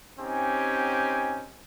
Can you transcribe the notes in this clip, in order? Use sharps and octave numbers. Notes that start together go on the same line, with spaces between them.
C4 C#4 D#4 G4 G#5